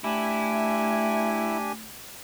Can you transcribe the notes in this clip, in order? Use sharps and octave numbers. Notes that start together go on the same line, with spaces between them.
A3 D4 E4 G4 G#5